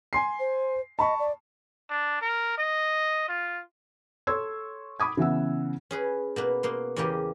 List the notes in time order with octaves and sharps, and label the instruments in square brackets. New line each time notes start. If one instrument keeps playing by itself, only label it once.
[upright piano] G#5 C6 C7
[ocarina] C5
[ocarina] D#5 [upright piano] A5 B5 C#6
[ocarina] D5
[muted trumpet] D4
A#4
D#5
F4
[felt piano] A4 C#5 C6 C#6 E6 G#6
B5 D6 D#6 G#6
C#3 E3 B3 F#5 E6
[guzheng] C#4 G#4 B4
B2 A#3 B4
B2 A#3 C6
E2 C#3 A#3 G4 D#5